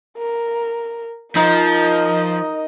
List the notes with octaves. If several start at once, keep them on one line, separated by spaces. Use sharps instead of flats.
A#4
F3 D#4 A#4 D#5